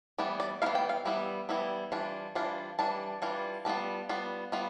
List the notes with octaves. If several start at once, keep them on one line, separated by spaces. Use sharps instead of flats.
E3 G3 B3 E4 D5
D5
E3 G3 B3 E4 F5
G5
F5
E3 G3 B3 E4
E3 G3 B3 E4
E3 G3 D4 F4
E3 G3 D4 F4
E3 G3 D4 A5
E3 G3 D4 F4
G3 B3 F4 A5
G3 B3 F4
G3 B3 F4